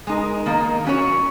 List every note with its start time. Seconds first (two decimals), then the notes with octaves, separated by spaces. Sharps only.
0.07 G#3 D#4 A#4
0.46 D#3 A#3 D#4 A#4
0.85 F#3 C#4 F#4 C#5